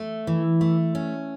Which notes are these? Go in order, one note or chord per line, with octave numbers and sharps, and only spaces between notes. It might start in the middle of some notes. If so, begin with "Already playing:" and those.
Already playing: A3
E3
A3
C#4